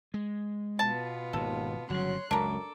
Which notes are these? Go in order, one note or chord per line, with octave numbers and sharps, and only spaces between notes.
G#3
B2 B3 F4 A5
G#1 D#2 A4
G1 C#3 F#3 C#5 C6 F#6
C#2 F#2 D4 A4 A#4 D6